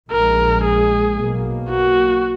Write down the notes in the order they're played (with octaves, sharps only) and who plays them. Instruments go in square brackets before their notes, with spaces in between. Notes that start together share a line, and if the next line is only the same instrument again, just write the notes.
[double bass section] A#1 A#2 G#3 [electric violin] A#4
[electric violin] G#4
[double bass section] B1 B2 A#3
[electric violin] F#4